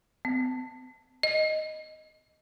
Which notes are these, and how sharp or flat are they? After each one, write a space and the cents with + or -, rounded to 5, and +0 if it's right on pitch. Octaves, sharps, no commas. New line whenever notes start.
C4 -40
D#5 +0